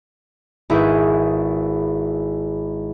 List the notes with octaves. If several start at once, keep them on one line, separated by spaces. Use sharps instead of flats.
G#1 E4 G#4 B4 C#6 G6